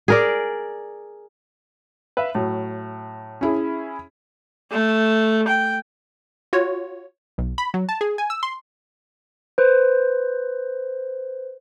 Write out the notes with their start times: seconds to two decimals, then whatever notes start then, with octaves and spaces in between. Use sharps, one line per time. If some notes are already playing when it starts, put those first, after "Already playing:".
0.08 G#4 A#4 D5
2.17 B4 E5 F5
2.35 A2 F#3
3.41 C#4 E4 G#4
4.71 A3
5.47 G5
6.53 F4 F#4 C#5
7.38 B1
7.58 B5
7.74 F#3
7.89 A5
8.01 G#4
8.18 G#5
8.30 E6
8.43 C6
9.58 B4 C5